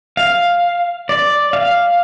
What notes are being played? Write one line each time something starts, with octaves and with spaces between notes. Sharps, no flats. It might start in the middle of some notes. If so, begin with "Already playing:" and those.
F5
D5
F5